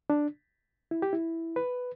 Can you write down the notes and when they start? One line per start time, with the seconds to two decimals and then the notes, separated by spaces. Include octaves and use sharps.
0.10 D4
0.91 E4
1.02 G4
1.13 E4
1.56 B4